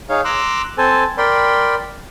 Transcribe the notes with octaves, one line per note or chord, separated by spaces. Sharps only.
D#4 G#4 C#5 F5
A#5 C6 D6 E6 F#6
C4 A4 C5 G#5 A5
A#4 D5 G5 B5 C6